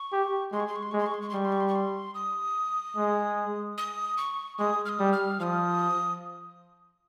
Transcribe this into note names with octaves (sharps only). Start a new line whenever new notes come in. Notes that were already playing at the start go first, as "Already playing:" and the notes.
Already playing: C#6
G4
G#3 C6
C#6
C6
C#6
C6
G#3 C#6
C6
C#6
C6
C#6
C6
G3 C#6
C6
C#6
C6
C#6
C6
D#6
G#3
D#6
C#6
G#3 D#6
F6
D#6
G3
F6
F3 D#6 F6